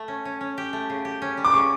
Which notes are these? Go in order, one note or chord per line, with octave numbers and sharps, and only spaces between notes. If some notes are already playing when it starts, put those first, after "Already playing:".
Already playing: A3
C#4
C#4
C#4
G4
A3
C#3
G4
C#4
G3
D6
C#3 C#6